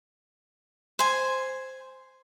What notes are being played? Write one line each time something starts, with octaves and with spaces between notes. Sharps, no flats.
C5 G#5